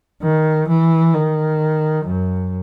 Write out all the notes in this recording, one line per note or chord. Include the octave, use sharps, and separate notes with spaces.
D#3
E3
D#3
F#2